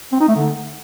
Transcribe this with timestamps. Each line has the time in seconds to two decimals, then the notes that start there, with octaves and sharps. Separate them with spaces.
0.12 C4
0.20 D#4
0.28 A3
0.36 D3